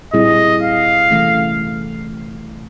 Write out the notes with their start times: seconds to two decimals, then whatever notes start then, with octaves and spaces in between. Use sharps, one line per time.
0.13 A#2 G3 C4 E4 G#4 D#5
0.63 F5
1.11 C3 E3 A3 C#4